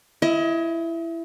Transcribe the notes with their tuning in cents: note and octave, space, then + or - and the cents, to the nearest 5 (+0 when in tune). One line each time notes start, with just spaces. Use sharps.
E4 +15 D#5 +35